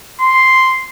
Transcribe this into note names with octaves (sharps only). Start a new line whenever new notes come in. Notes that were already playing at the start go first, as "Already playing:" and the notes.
C6